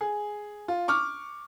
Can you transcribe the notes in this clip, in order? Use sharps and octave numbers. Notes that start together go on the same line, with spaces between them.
G#4
F4
C#6 D6 F6